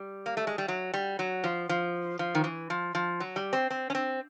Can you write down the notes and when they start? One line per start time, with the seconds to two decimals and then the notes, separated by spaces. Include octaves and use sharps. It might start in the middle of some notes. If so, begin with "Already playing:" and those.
Already playing: G3
0.26 A#3
0.37 A3
0.47 G#3
0.58 G3
0.68 F#3
0.94 G3
1.19 F#3
1.44 F3
1.69 F3
2.19 F3
2.35 D#3
2.44 E3
2.70 F3
2.95 F3
3.20 F#3
3.36 G3
3.53 C4
3.70 C4
3.90 C#4
3.95 C4